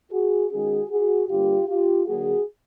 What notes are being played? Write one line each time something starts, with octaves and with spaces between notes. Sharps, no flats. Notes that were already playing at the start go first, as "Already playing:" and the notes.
F#4 G#4
D#3 G#3 C#4 F#4 G#4
F#4 G#4
G2 D3 G3 A#3 F4 G4
F4 G4
D3 F#3 A#3 F#4 G#4